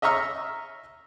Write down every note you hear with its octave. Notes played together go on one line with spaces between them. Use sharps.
D#5 E5 A#5 C#6 E6 F6